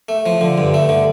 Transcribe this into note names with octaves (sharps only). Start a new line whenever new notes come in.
A3
F3
D3
G2
A3
D3